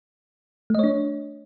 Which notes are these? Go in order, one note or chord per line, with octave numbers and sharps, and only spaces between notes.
A3 D4 C#5 D#5